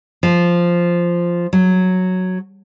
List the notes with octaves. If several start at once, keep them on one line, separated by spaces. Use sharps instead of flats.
F3
F#3